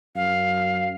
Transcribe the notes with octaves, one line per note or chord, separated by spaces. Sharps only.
F#2 F5